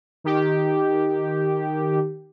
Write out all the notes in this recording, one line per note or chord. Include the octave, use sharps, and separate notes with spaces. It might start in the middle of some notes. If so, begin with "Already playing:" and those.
D#3 G4